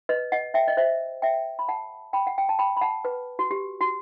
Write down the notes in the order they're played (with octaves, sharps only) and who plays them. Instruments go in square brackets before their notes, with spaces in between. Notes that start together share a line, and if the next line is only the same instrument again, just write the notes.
[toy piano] B4 D#5
D#5 F#5
E5 G5
D#5
C5 E5
E5 G5
B5
F#5 A5
G5 B5
F#5
G5
A5
G5 B5
B5
F#5 A5
B4
F#4
G4
F#4